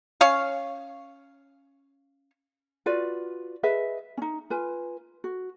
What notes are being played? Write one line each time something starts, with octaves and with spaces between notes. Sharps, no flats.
C#4 C#5 F5
F4 F#4 B4 D5
G#4 B4 D#5 E5
C#4 D#4
F4 B4 G#5
F#4